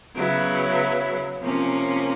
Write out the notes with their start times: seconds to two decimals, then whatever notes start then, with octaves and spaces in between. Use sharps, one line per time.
0.14 C#3 F#3 B3 E4
1.40 C3 F3 A#3 C#4